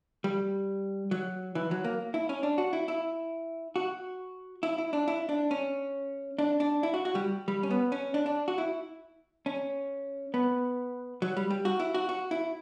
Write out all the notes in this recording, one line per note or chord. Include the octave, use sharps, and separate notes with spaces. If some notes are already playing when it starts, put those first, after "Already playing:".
G3
F#3
E3
F#3
A#3
E4
C#4
D4
F#4
E4
E4
F#4
E4
E4
D4
E4
D4
C#4
D4
D4
E4
F#4
F#4
G3
G3
C#4
B3
C#4
D4
D4
F#4
E4
C#4
B3
F#3
G3
G3
F#4
E4
F#4
F#4
E4